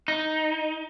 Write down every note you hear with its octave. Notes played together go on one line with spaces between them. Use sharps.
D#4